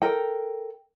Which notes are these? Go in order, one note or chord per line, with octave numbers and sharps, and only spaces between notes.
A4 A#4 G5